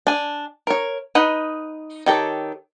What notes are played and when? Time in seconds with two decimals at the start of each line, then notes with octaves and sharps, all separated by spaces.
0.07 D4 G#5
0.67 A#4 C#5
1.15 D#4 B4 D#5 F#5
2.06 D#3 G4 A4 C#5